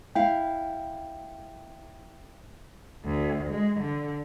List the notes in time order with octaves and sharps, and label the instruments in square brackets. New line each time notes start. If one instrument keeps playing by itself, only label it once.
[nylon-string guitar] E4 F5 [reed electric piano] G5
[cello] D2
G#3
D3